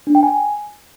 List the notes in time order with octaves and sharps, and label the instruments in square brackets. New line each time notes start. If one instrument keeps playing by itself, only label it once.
[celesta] D4
G5
G#5